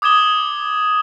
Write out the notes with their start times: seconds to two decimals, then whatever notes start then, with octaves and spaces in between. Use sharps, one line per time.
0.02 D6 D#6 G#6 E7 G7